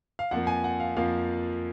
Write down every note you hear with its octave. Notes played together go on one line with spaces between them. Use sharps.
F5
F2 F3 A#3 F#5
G#5
F#5
F5
F2 F3 A#3 F5